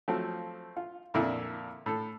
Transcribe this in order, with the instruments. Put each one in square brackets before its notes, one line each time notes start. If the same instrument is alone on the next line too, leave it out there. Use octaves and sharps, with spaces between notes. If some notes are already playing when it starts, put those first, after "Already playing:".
[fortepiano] F3 F#3 A3 C4
F4
F2 A#2 D3 E4
A2 A4